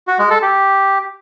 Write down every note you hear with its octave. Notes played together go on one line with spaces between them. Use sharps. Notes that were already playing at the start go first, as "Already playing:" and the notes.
F#4
G#3
A4
G4